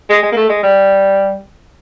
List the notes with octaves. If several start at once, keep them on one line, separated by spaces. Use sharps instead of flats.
G#3
G#3
A#3
A3
G#3
G3